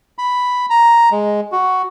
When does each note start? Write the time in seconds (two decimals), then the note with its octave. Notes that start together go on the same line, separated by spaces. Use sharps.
0.18 B5
0.70 A#5
1.12 G#3
1.52 F#4